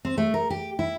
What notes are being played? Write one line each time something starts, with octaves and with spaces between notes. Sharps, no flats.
C4
A3
A#4
G4
E4